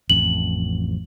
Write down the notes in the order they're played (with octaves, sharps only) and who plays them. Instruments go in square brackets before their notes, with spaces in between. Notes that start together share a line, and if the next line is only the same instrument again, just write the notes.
[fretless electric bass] A1 F2 [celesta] F#7